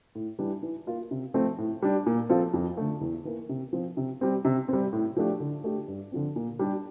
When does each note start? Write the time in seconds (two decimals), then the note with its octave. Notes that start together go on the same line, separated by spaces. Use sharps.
0.15 A2
0.39 E3 G3 D4
0.63 E3
0.87 A#3 F4
1.11 C3
1.34 F3 A3 C4
1.58 A2
1.82 G3 D4
2.06 A#2
2.29 F3 C4 F4 A4
2.54 F2
2.77 D3 A3
3.01 E2
3.25 E3 A#3
3.49 C3
3.73 F3 C4
3.97 C3
4.21 G3 C4
4.45 C3
4.68 G3 C4
4.93 A2
5.17 F3 A3 D4 G4
5.40 D3
5.64 A3 D4 G4
5.88 G2
6.12 D3 F3 C4
6.36 A#2
6.59 G3 D4 G4